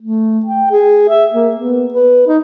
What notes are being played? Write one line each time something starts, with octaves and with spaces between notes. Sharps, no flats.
A3
G5
G#4
E5
A#3
B3
B4
D#4